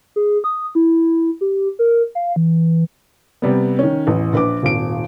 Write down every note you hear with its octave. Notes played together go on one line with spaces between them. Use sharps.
G#4
D#6
E4
G4
A#4
F5
E3
C3 G3 B3
D#3 C#4
A1 E2
A#1 B4 D6
D#1 G#1 D7